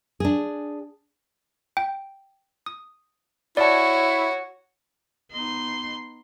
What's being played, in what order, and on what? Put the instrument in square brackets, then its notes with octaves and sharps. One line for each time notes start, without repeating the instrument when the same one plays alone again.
[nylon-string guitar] D4 G#4
[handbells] G5
D#6
[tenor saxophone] E4 [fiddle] F#4 [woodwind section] C#5 [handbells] D5 A5
[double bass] B3 D#4 [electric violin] C6